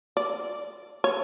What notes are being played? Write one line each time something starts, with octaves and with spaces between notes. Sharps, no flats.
D5
C#5